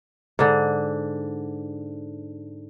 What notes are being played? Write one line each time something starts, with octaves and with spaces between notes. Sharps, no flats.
G#2 D3